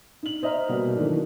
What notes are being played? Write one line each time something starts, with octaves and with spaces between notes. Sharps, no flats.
D#4 F#7
C5 D#5 E5 A#5 F6
B2 G3 A#3 F#4
D#3 E3 F#3 A3 D4